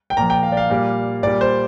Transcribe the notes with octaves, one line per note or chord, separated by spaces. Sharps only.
G5
A#2 F3 A#5
G5
F5
D5
F5
A#2 G3
A#2 G3 D5
C5